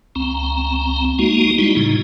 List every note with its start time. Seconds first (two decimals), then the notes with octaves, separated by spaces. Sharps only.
0.15 C#2 C4 A#5
1.19 G#3 A#3 D#4 F#4
1.58 G3 G#3 D#4 E4 F#4
1.76 A2 C#3 D#4